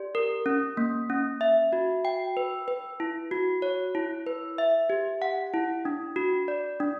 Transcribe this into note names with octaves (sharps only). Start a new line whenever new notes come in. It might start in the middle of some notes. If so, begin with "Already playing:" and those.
Already playing: G4 D5
A#4
C#4
A#3
C#4
E5
F#4
G5
B4
B4
E4
F#4
C#5
E4
B4
E5
G4
F#5
E4
D4
F#4
D5
D4